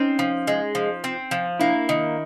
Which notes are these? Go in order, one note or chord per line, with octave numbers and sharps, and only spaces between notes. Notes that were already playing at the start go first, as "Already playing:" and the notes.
Already playing: C4 C#4 D#4
F3
G#3
F3
C4
F3
A#3 D4 E4
D#3